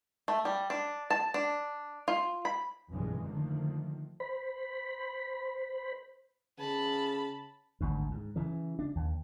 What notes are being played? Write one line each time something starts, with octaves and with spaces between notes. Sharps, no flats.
A3
G3
D4
A5
D4
F4
B5
F1 B1 G2 C#3 E3 G#3
D3 D#3 F3 A3 A#3
C5 B5
C#3 A5 B5
G#1 D2 G2
G#2
C#3 E3
D4
D#2